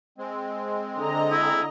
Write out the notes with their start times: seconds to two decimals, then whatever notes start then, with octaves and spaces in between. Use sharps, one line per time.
0.18 G#3 C4
0.98 D3 D#5 A#5
1.31 E4